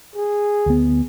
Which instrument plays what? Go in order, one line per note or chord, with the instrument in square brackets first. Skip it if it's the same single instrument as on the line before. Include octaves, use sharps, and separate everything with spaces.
[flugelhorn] G#4
[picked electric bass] D2 B3